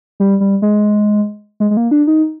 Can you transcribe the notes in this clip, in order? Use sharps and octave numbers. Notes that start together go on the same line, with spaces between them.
G3
G3
G#3
G#3
G#3
A#3
D4
D#4